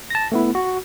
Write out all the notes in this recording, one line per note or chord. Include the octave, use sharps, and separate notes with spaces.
A5 A#6
A3 B3 E4
F#4